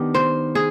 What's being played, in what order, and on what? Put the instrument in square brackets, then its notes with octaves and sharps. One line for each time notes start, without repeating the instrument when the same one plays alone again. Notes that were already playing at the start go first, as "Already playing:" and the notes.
Already playing: [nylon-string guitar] D#3 B3 D4 [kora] G4
[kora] C5
G#4